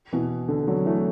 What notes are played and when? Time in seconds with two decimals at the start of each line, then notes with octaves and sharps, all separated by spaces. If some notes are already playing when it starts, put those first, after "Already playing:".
0.13 B2 E3
0.49 D3
0.67 D3 F#3
0.86 E3 A3